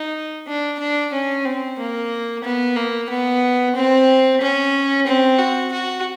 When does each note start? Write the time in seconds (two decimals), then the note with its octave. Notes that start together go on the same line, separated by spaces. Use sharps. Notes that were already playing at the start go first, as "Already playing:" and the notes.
Already playing: D#4
0.47 D4
0.79 D4
1.13 C#4
1.45 C4
1.79 A#3
2.44 B3
2.76 A#3
3.09 B3
3.76 C4
4.41 C#4
5.07 C4
5.39 F#4
5.72 F#4